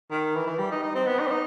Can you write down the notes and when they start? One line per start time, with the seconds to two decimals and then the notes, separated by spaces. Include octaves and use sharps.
0.10 D#3
0.35 E3
0.47 E3
0.59 G3
0.71 D#4
0.83 D#4
0.95 C4
1.07 B3
1.19 D#4
1.27 C4
1.31 D#4